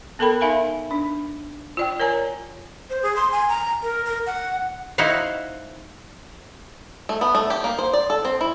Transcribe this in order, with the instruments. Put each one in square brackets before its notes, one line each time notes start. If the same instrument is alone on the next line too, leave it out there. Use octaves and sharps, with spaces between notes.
[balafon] B3 A4 A#4 G5 B5
D#4 A#4 E5 F5 G#5 B5
D4
F4 D5 G5
A#4 C#5 D5 G#5 A#5
[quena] C5
G#4
C6
G#5
A#5
A#4
A#4
F#5
[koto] D#4 E4 F#4 C5 F5
[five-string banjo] A3
B3
A3
G4
A#3
C5
D5
A4
C4
E4